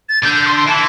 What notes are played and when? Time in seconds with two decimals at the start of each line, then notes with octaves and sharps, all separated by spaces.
0.09 A6
0.24 D3 G6
0.34 G6
0.46 C6
0.57 C6
0.67 E3 A5